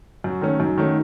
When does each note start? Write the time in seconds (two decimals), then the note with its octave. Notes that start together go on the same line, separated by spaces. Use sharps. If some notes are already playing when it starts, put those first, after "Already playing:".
0.24 F#2 F#4
0.41 D#3 A3 C#4
0.60 F#2 D#4
0.78 D#3 A3 C#4